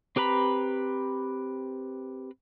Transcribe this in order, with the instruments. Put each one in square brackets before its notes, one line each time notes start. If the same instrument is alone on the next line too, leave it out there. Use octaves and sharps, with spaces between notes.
[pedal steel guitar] C4 G4 B4 A#5 B5